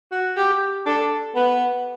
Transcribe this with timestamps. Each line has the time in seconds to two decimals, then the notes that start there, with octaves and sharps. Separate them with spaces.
0.12 F#4
0.36 G4
0.86 D4 A4
1.36 B3 B4